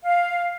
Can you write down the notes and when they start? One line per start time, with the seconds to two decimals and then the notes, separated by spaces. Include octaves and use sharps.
0.04 F5